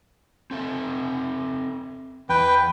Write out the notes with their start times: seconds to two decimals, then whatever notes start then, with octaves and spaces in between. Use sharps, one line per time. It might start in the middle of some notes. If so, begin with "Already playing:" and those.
0.51 C4 A4 E5
2.29 E2 B4 G5